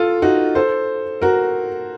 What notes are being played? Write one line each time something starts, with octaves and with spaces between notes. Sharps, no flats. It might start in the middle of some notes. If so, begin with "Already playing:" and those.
Already playing: F4 A4
D#4 F#4
A4 C5
F#4 A#4